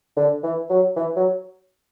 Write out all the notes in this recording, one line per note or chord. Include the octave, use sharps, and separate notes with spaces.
D3
E3
F#3
E3
F#3